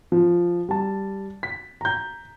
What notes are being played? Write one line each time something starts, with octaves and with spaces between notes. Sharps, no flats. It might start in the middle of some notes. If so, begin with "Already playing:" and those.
F3
G3 A5
B6
A#5 G6